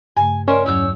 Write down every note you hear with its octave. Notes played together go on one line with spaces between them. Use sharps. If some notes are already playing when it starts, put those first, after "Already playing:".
G2 C#3 A3 G#5
C#4 A#4 C5 D5 D#5
E2 G2 F#3 C#5 E6 G6